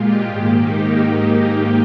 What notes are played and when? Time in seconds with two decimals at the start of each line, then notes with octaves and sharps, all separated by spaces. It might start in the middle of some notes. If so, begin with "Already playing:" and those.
Already playing: A#2 G#3 F4 G4
0.26 G#2 D#3 A#3
0.59 D#4